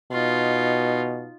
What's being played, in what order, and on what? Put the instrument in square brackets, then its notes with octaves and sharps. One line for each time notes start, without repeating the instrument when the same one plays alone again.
[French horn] B2 [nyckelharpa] D#4 F4